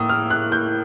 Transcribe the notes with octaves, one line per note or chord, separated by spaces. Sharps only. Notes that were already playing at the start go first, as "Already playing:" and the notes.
Already playing: A2 A#3 D#6 E6
F6
F#6
G6